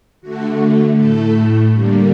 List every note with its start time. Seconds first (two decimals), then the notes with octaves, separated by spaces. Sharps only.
0.21 D3 A3 F#4
0.95 A2 A3 A4
1.71 D3 G3 A#3